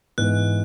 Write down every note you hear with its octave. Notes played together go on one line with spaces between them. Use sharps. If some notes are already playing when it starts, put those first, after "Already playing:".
G#2 E3 B3 F#6